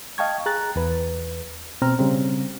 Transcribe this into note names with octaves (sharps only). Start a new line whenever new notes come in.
D#5 F5 G5 A5 C#6 G#6
G#4 A#5 F#6 A6
E2 B4
B2 C4 A#5 F6
C#3 G3 C4